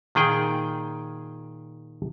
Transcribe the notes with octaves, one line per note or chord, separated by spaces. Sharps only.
A#2 D#3 G#4 G5